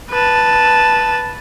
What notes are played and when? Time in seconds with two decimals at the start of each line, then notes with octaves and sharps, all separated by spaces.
0.11 B4 A5